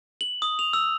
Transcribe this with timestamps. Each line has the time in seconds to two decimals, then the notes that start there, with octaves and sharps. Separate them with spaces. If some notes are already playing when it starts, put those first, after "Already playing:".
0.21 F#7
0.42 D#6
0.59 F7
0.73 E6